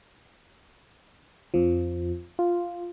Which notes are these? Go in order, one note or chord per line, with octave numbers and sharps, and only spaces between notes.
F2 F3
F4